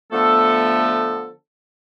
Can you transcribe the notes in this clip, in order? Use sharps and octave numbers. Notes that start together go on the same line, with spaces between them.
D3 F3 A3 B3 A4